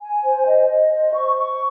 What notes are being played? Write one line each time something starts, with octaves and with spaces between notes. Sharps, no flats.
G#5
C5
D#5
D#5
C5
C#6
C#6